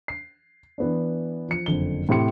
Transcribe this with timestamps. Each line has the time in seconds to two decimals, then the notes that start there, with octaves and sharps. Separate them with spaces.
0.08 C7
0.78 E3 B3 D4
1.49 F3 C#7
1.66 F#1 F2 D3 G7
2.09 A2 C3 E4 G4 C6 C#7